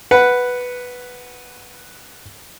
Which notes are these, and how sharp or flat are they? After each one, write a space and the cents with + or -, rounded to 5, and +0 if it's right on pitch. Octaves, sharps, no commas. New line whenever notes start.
B4 +0 F#5 +0